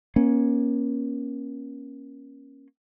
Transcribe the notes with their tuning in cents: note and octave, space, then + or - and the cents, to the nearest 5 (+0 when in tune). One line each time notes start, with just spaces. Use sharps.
A#3 +30 C#4 -10